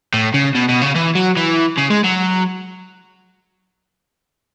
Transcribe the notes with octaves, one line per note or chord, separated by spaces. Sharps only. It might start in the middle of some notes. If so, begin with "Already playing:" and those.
A2
C#3
B2
B2
C#3
E3
F#3
E3
C#3
G#3
F#3